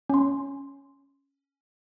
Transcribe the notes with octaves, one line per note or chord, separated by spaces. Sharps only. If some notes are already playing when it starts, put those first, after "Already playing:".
C#4 C6